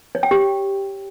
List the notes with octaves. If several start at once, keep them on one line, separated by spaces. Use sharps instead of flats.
C#5
G5
G4